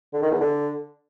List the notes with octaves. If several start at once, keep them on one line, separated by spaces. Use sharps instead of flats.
D3
D#3
E2
D3